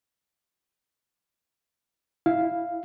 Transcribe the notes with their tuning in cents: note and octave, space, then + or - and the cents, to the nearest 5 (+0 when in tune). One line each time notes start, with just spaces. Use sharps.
E4 -10 F5 +0